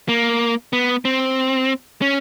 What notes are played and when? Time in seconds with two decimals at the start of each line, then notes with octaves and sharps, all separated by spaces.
0.09 A#3
0.73 B3
1.05 C4
2.02 C#4